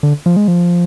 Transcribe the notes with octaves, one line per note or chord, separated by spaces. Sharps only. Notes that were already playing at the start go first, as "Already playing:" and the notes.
D3
F3
G#3
F3